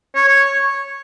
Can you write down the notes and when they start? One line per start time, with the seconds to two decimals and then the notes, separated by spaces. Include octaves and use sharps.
0.15 C#5
0.28 C#5